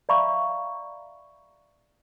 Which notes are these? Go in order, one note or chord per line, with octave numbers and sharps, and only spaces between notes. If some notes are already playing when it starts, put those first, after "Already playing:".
D5 E5 F5 A#5 B5 C#6